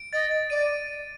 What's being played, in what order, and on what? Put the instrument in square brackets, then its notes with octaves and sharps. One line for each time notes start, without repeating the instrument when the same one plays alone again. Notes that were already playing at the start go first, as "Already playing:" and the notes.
Already playing: [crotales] D7
[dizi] D#5 [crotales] A6
[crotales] A6
[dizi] D5 [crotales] D#7